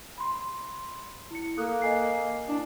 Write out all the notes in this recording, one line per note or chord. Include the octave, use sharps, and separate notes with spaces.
B5 C6
E4 C#7
A#3 A4 D#6 F#6
D#5 G#5 C7
D4 E4